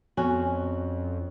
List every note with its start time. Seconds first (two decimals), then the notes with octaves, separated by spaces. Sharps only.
0.17 F2 B3 C#4 F#4 G#5